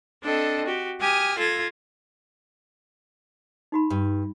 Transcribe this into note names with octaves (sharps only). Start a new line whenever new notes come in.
C4 D4 A4 D#5
F#4 G4
G4 G#5 D#6 F6
F4 A4 G#6 A#6
D#4 F#4 B5
G2